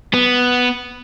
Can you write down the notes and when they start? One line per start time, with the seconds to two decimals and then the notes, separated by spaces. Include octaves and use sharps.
0.14 B3